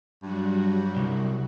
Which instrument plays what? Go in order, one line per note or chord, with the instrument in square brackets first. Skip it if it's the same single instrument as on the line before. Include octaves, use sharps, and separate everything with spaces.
[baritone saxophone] G2 [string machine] F#3 G3 F#4
[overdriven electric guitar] C2